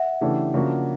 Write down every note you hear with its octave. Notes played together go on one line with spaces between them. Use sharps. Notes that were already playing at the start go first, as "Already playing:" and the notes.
Already playing: E5 F#5
C#3 E3 A3 D4 G4
C#3 F3 A#3 D4 F#4